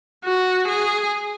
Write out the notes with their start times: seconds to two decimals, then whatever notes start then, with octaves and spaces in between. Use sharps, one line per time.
0.25 F#4
0.68 G#4